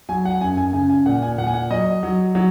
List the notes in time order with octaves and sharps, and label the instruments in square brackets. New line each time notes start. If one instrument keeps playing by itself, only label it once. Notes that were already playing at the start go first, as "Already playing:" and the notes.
[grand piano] F#3 G#5
F#5
F#2 G#5
G#5
C#3 G#5
G#5
A#2 F#5
G#5
A#2 F#5
G#5
F#5
F#3 D#5
F#3
F#3